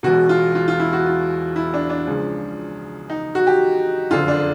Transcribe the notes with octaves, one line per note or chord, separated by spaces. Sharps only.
E1 E2 B2 F#4
F4
F4
F4
E4
F#4
F4
E4
D4
D4
C#2 C#3 F3
D#4
F#4
G4
F#1 F2 D3 F4
D4